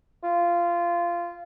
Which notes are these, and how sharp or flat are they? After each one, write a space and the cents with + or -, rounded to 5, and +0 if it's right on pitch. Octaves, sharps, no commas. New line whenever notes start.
F4 -15